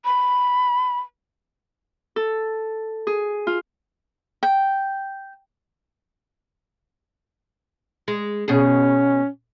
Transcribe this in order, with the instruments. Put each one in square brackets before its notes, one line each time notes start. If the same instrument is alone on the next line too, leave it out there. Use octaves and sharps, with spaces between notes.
[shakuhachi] B5
[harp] A4
G#4
F4
[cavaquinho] G5
[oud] G#3
[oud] B2 G#4 [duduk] C#4